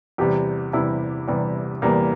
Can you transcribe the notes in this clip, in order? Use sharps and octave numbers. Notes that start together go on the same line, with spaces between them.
E2 C3 G3 G4
E2 C3 G3 E4
E2 C3 G3
E2 C3 G3 A#3